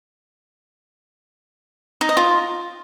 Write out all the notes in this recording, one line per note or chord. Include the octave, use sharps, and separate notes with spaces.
D#4
D#5
F4